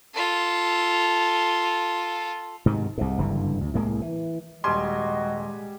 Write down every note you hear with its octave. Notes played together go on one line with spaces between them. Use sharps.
F4 A4
G#2 C3 D#3
C2 G#2
F#1 G2 D3 E3
D2
C2 A2 G#3 A#3
E3
D#1 G3 G#3 F#4 D#5 G#5 C6